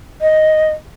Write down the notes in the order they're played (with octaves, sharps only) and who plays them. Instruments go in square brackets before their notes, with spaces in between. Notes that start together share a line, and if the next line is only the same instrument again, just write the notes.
[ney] D#5